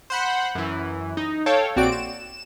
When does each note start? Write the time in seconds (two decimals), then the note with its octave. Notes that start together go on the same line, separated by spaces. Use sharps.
0.10 C5 F#5 B5
0.55 F#2 E3
1.17 D#4
1.46 A4 C#5 F5 G5
1.76 A#1 C4 F#4 D5 D7
1.92 E7